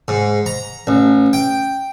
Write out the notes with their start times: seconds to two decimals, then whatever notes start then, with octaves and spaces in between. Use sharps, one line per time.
0.08 G#2
0.46 A#5
0.87 A1
1.33 G5